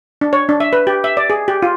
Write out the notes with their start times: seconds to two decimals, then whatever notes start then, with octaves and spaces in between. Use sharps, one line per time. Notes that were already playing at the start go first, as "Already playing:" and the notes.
0.21 D4
0.33 C#5
0.49 D4
0.60 E5
0.73 B4
0.87 G4
1.04 E5
1.17 D5
1.30 G#4
1.48 G4
1.62 F4